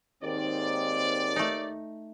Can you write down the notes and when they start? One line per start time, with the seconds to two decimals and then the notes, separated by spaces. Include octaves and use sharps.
0.23 D#2 G#2 D#3 C4 D5
1.36 A3 D#4